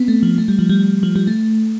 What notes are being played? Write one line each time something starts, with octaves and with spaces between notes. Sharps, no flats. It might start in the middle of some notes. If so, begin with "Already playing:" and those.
Already playing: B3 C4
A3
F3
A3
G3
F3
G3
F3
G3
A3